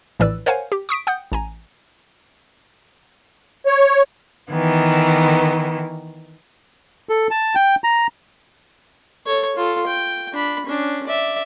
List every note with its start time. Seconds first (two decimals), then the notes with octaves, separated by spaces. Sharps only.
0.20 A#1 A2 E3 B4 D5 E6
0.46 A#4 C5 C#5 F5 F#5 G#5
0.72 G4
0.89 C#6 D#6 B6 D7
1.07 F#5 G5 D#6 G6
1.32 A1 G#5 A#5
3.66 C#5
4.51 D#3 E3 B3
7.09 A4
7.31 A5
7.55 G5
7.84 A#5
9.26 A4 C#5
9.56 F4 A4
9.87 G5
10.33 D4 B5
10.66 C#4 D4
11.07 D5 E5